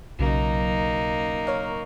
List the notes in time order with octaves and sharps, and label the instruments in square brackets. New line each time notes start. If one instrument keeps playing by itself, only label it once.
[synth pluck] B1 C#3 F#3 [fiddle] A#3 D#4
[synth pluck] A#4 C#5 F5